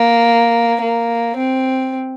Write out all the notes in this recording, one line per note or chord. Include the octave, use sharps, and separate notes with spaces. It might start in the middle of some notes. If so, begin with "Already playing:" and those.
Already playing: A#3
A#3
C4